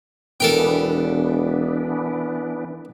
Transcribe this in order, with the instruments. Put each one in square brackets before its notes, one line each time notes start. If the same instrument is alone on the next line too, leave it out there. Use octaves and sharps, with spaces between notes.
[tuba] E1 [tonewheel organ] E3 B3 D4 [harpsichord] A4 A#4 G5